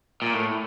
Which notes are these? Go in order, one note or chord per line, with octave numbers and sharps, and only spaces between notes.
A#2
A2